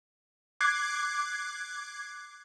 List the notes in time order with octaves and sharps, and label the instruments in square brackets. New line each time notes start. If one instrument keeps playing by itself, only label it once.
[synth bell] D6 F#6 G#6 C7